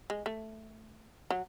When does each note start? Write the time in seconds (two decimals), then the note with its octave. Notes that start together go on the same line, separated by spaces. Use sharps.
0.10 G#3
0.26 A3
1.30 F#3